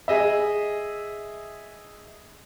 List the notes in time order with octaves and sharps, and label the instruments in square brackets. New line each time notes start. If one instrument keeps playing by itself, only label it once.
[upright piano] G#4 D#5 E5